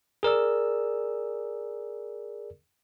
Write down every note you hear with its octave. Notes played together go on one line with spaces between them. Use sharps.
G#4 A#4 D5 E6